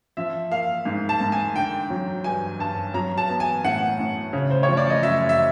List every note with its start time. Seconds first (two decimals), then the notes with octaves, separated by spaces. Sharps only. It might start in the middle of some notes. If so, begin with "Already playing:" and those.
0.17 F3 E5
0.51 A#3 F5
0.85 G#2
1.09 A5
1.20 G#2
1.32 G#5
1.55 D3 G5
1.90 F#3
2.24 G2 G#5
2.59 G2 A5
2.94 F#3 A#5
3.18 A5
3.29 B3
3.40 G#5
3.64 A2 F#5
3.99 A2
4.33 C#3
4.50 C5
4.63 C#5
4.68 F3
4.77 D5
4.90 D#5
5.03 F#2 E5
5.29 E5